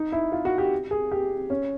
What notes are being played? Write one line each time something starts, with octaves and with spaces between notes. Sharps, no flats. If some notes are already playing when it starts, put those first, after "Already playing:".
Already playing: D#4
E4
F4
F#4
G4
G#4
G4
C#4